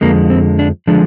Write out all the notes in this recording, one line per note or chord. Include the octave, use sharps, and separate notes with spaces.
F2 D3 F3 G#3 A#3
C4
D4
D3 F3 G#3 D4